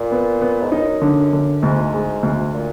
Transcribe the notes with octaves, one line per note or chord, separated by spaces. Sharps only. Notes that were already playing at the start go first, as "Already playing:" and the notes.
Already playing: A#2
B3
B3
G#2
F#2 D#4
D3
D3
D2 G#2
G#3
D2
A#2